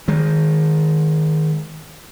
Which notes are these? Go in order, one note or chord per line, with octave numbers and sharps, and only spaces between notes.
D#3 G#3